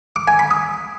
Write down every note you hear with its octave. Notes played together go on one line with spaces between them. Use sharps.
D6
G#5
B5
D#6